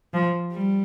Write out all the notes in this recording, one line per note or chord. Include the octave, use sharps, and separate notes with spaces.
F3
G3